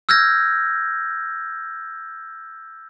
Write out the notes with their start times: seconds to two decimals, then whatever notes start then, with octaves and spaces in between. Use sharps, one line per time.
0.09 E6 F6 G6 G#6 A#6